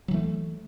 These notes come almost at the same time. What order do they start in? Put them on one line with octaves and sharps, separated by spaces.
F#3 E3 A3